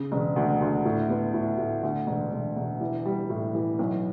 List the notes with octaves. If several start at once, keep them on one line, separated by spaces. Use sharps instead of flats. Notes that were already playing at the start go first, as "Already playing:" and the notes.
Already playing: C#3
E1
D2
D2
A2
B3
A2
A2
D2
E1
E1
E1
E3
G3
A2
E3
B1